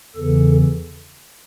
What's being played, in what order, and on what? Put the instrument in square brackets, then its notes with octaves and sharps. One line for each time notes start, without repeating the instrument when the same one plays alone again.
[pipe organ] E2 C#3 E3 A4